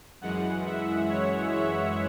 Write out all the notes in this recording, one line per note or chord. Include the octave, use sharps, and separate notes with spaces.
F#2 E3 G#3 F#5
E5
C#5
E5